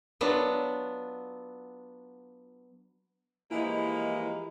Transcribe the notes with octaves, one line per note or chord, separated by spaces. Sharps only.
F#3 B3 D4 F4
E3 F3 G#3 A#3 E4 G4 D#5 B5